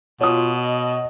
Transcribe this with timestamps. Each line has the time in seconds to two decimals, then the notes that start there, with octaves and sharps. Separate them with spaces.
0.21 B2 F4 C#5 D#6
0.55 D#5